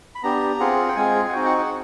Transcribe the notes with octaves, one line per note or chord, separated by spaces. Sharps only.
B5
B3 D4 G4 A#5
C4 F4 G#4 F#5
G5
G#3 C4 F4 G#4 G#5
F#5
C4 D#4 F#4 G5
F#5
F#5